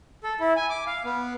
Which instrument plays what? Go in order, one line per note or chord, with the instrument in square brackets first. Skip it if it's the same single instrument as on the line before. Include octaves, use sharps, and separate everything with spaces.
[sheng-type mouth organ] A4
E4
G#5
D6
F5
B3